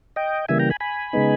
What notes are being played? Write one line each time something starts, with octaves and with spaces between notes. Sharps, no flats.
D#5 G5
C#3 E3 G3 A#3 E5 G#5
G5 A#5
G#5 B5
G#5 B5
C#3 G#3 B3 D#4